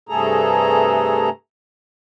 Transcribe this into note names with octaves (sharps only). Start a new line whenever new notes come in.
G2 C3 A3 G#4 A4 A#5